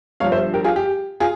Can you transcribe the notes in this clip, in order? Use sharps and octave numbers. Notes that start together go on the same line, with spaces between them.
G1 G2 F3 C#5 F5
C5 E5
G4 A#4
F4 G#4
G4
F4 G#4